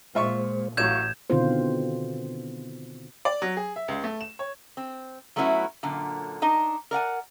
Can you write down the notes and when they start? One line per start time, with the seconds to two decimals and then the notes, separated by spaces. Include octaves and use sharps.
0.15 A#2 G#3 F4 C5 E5 C#6
0.77 A1 A2 F#3 F5 C#6 G6 G#6 E7
1.30 B2 D3 D#3 C4 F4 C5
3.25 D5
3.42 F#3
3.57 G#4
3.76 E5
3.88 C#2
4.04 A3
4.21 E7
4.39 C#5
4.77 C4
5.36 F#3 A3 B3 C#4 E4 F#4
5.83 F#2 A#2 D3
6.42 D4 D#4 D#5
6.91 A#4 D5 F#5 G#5